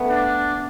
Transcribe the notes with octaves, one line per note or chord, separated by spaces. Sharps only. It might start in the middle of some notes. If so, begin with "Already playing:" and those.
Already playing: A3 B3
D4